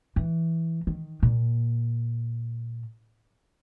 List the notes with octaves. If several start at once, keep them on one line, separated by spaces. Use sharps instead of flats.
E3
D#3
A#2